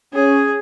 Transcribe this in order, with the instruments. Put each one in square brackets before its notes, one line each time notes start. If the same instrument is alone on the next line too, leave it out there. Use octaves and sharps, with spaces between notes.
[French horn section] C#4 [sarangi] G#4